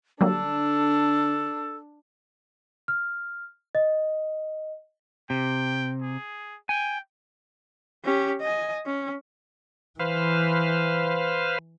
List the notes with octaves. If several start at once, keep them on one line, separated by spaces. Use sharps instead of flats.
D3 F#3 G3 A#3 D4 A4
F6
D#5
C3 G5
G#4
G5 G#5
C#4 G4
D#5 G#5
C#4
E3 B4 C5 F5